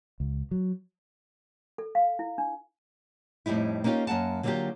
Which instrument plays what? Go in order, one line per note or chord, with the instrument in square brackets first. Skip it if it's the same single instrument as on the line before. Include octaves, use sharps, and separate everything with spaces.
[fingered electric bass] C#2
F#3
[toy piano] A4
F5
E4
D4
[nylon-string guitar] F2 A2 G3 D#4 E4
A#3 C#4 D#4 F4 G4
F#2 A#3 F#5 A5
D3 F#3 A#3 E4 F4 G4